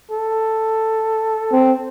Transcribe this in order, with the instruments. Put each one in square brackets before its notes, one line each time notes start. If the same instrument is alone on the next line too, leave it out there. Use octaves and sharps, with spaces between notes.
[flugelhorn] A4
[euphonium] C4